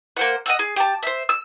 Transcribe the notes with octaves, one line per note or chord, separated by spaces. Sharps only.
A#3 C5 F#5
D#5 F#5 E6
G#4
G4 A5
C5 E5
E6